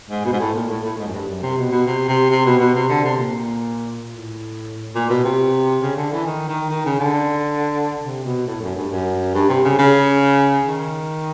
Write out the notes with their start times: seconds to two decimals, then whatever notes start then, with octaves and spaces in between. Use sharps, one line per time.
0.10 G#2
0.25 B2
0.33 G#2
0.39 A2
0.54 A#2
0.69 A2
0.83 A2
0.98 G#2
1.07 F#2
1.13 G2
1.28 F#2
1.43 C3
1.57 B2
1.71 B2
1.86 C3
2.08 C3
2.30 C3
2.45 B2
2.59 B2
2.74 C3
2.89 D3
3.04 C3
3.18 A#2
4.06 A2
4.95 A#2
5.09 B2
5.24 C3
5.82 C#3
5.96 D3
6.12 E3
6.26 D#3
6.48 D#3
6.70 D#3
6.85 C#3
7.00 D3
8.03 C3
8.24 B2
8.46 A2
8.62 F#2
8.75 G2
8.91 F#2
9.34 G2
9.49 C3
9.64 C#3
9.79 C#3
10.67 D#3